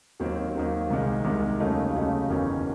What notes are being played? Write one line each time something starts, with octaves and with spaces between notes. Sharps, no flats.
D#2 D#3 F#3 C4
D#2 D#3 F#3 C4
C2 C3 D#3 G#3
C2 C3 D#3 G#3
D#2 C#3 F#3 A3 D#4
D#2 C#3 F#3 A3 D#4
F#1 E2 D#3 F#3 C#4